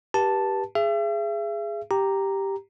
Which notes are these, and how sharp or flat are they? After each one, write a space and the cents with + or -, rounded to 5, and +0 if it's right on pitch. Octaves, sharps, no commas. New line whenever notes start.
G4 +0 B4 -35 A5 +0
G#4 +0 E5 +40
G4 +0 A#5 +0